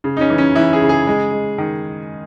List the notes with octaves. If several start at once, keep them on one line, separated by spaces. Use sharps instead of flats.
C#3
D#4
C#4
E3
C#4
E3 E4
G#4
C#3
G#4
G#3
G#3
D#3